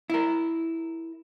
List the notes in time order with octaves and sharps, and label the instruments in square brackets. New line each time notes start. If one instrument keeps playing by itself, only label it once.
[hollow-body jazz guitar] E4 A#4